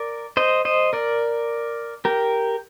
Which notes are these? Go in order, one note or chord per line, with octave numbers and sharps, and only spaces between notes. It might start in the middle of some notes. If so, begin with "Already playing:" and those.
Already playing: A#4 D5
C5 D#5
C5 D#5
A#4 D5
G4 A#4